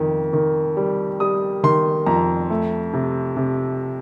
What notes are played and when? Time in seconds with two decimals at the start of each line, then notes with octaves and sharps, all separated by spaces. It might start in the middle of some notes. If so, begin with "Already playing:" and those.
Already playing: F2 D#3
0.33 D#3
0.77 G3
1.20 G3 D#6
1.63 D#3 C6
2.06 F2 A#5
2.50 A3
2.93 C3
3.37 C3